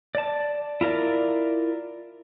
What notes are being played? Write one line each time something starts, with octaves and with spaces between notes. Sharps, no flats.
D5 A5
E4 F4 A#4 D5